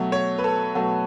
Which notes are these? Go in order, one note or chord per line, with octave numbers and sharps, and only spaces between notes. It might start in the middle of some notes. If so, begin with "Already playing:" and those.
Already playing: B2 F#3 A3
C#5
B4
A4
B2 F#3 A3 F#4